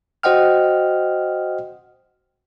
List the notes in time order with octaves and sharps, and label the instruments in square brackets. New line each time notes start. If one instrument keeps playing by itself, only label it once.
[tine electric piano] F#4 C5 D#5 F#5 G5 F6